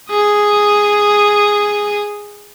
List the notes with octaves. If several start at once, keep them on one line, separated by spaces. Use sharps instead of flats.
G#4 D#6